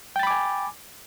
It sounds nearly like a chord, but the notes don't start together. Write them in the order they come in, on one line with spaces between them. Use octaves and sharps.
G5 A6 B5 D6 G#5